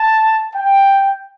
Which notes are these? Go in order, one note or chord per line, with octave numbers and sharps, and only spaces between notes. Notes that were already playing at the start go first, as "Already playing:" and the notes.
Already playing: A5
G5